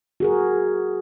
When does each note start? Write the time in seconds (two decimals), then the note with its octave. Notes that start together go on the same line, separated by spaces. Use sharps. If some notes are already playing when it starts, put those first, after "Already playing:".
0.20 F#4 G#4 A#4